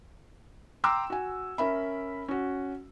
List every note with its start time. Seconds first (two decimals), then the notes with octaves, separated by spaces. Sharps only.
0.84 G5 A#5 C6 D6 E6
1.10 F#4 G#5
1.58 C#4 A#4 E5 B5
2.28 C#4 F#4